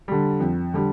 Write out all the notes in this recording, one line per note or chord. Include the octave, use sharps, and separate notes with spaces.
D3 G3
F2
D3 G3